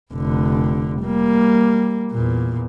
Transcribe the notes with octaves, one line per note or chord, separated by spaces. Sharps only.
F1 D3
G3 A#3
E2 A#2